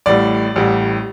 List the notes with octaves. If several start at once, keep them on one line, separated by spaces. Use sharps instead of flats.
A1 A2 G3 D5
A1 A2 G3